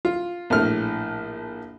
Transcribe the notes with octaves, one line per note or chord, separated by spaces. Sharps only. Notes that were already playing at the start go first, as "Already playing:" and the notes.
F4
A#1 A2 F6